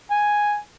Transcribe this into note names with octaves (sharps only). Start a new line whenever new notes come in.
G#5